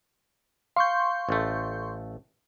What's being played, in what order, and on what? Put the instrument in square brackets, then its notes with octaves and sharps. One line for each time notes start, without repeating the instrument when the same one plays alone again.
[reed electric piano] F5 [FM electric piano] C6 C#6 G6
[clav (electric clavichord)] A1 A3